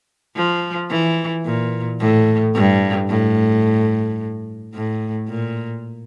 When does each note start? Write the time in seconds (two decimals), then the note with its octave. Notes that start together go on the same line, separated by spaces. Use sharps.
0.36 F3
0.90 E3
1.45 A#2
2.01 A2
2.55 G2
3.09 A2
4.74 A2
5.28 A#2